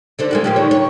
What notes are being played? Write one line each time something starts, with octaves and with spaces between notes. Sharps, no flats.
D3 D4 C5
G#3 A#3 F#4
A2 F3 G4
D3 D#3 C#5
C#5